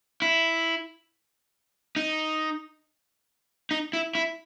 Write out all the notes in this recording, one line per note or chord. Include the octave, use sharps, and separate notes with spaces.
E4
D#4
D#4
E4
E4